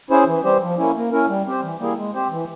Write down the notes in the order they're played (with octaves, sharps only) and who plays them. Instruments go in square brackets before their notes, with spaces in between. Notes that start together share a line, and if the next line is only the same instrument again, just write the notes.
[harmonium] C#4 E4 G#4 C5
E3
G3 C4 G4 C5
F3
A#3 C#4 E4
A#3
C#4 E4 A#4
G3
C4 G4 C5
E3
G3 A#3 E4 G#4
G#3
C4 G4 C5
E3